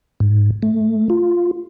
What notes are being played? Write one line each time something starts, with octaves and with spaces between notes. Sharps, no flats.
G#2
A3
F4